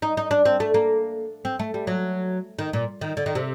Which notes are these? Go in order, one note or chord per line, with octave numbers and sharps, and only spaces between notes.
D#4
D#4
D4
C4
A3
A#3
C4
A3
G3
F#3
D#3
A#2
D#3
D3
D#3
C3